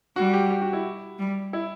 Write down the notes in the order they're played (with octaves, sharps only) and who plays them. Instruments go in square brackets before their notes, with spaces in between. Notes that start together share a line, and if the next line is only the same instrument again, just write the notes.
[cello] G3 [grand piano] F#4
[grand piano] G4
G4
F#4
E4
[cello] G3
[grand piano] E4